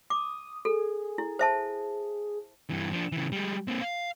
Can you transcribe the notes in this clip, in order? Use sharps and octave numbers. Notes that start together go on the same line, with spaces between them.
D6 D#6
G#4 A4
E4
C5 E5 A5
G2 E3
F3 D4
C#3 E3
G3 G#3
A#3 C4
F5